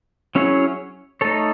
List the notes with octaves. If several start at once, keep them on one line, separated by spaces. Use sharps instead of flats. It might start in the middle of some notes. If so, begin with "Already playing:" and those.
F#3 C#4 E4 G#4 C#5
A3 D#4 A4 C#5